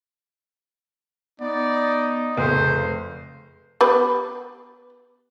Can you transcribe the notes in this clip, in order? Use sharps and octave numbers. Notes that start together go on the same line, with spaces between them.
B3 D#4 D5
F1 C#3 C5
B3 G4 B4